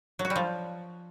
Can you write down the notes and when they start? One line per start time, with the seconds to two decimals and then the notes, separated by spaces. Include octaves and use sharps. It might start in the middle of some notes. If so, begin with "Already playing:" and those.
0.19 F#3
0.25 F#4
0.30 G3
0.36 F3